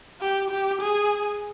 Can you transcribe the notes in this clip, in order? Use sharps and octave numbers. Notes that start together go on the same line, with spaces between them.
G4
G4
G#4